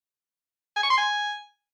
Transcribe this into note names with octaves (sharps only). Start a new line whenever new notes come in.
G#5
C#6
C6
G#5